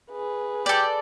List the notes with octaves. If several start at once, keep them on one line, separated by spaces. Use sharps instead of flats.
G#4 B4
G4 A4 D5